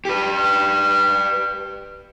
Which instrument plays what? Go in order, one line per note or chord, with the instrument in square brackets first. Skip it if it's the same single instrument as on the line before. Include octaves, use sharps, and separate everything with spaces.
[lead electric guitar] G4 B4